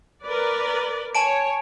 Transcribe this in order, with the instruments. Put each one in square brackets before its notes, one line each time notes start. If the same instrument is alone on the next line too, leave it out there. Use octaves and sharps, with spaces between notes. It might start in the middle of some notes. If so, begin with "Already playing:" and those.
[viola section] A#4 B4 D5
[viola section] C#5 [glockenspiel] G#5 A5 D7